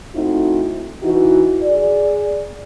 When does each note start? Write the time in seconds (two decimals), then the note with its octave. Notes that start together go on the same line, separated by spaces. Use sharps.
0.15 A3 C4 D#4 E4 F#4
1.03 E3 D#4 E4 F#4
1.62 G#4 D5